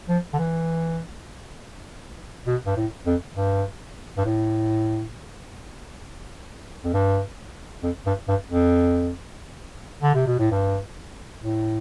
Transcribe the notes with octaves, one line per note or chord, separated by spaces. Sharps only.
F3
D3
E3
B2
G2
A2
F2
G2
G2
A2
F2
G2
F2
G2
G2
F2
D3
C3
B2
A2
G2
A2